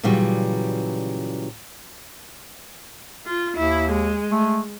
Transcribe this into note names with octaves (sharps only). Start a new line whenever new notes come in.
A#2 C#3 E3 F#3 G3
F4
D#2 E4
G#3
A3